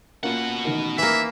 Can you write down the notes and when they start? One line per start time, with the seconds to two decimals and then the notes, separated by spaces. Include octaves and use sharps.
0.23 B2 A#3 C#4 F4 F#5
0.65 A1 D#3 A#4
0.98 E3 A#3 E5